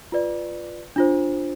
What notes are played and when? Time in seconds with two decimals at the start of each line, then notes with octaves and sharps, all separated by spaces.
0.12 F4 B4 D5
0.96 D4 F4 C5